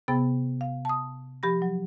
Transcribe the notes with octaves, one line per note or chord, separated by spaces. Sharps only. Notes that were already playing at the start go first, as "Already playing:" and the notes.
C3 B3 G#4 G5 B5 A6
F5
A5 D#6
F3 G4 B5 A#6
F#3